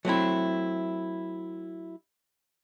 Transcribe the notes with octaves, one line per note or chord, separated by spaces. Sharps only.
F#3 A3 C4 E4